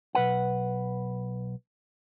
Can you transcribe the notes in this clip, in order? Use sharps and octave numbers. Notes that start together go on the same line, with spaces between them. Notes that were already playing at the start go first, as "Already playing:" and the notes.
B1 B4 F#5